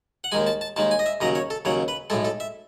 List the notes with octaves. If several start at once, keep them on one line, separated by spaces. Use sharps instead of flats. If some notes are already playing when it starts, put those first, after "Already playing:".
F#5
D#2 D#3 G#3 G#5
A5
A5
D#2 D#3 G#3 A5
G#5
D#5
E5
D#2 C#3 F#3 D#5
C#5
A4
D#2 C#3 F#3 C#5
B4
B1 A2 G#3 A4
A4
E5